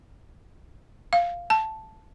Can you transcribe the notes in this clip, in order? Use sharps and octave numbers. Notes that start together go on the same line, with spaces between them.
F5
A5